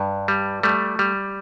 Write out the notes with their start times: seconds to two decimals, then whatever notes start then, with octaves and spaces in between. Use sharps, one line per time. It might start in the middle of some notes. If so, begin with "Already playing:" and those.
Already playing: G2
0.28 G3
0.63 G3 A3
0.99 G3